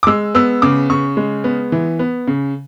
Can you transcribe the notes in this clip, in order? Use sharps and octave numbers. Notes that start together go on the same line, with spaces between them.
D6
G#3 E6
B3 E6
C#3 D6
C#3 C#6
G#3
B3
E3
B3
C#3